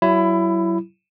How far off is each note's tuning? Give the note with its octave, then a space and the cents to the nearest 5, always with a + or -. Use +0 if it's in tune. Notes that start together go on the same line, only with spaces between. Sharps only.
F#3 +25 E4 +20 B5 +0